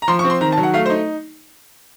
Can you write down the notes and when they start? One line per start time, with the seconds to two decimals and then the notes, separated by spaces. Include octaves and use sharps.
0.02 A#5
0.08 F3 C6
0.19 C#6
0.24 C4
0.30 C6
0.41 D#3 A#5
0.52 A5
0.57 F#3
0.63 F#5
0.73 A3 F5
0.86 C5
0.90 D#4